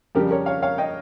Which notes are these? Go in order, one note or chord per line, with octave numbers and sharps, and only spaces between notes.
F2 C#3 G3 G4 A#4
A#4 C#5
C#5 F5
C#5 F5
D#5 G5